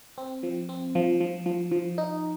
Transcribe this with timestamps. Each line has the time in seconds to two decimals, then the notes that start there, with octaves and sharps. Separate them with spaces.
0.18 C4
0.43 F3
0.69 C4
0.95 F3
1.20 F3
1.46 F3
1.72 F3
1.98 D#4